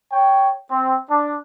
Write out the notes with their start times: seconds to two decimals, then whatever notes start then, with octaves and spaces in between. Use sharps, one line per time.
0.12 C#5 G5
0.70 C4
1.09 D4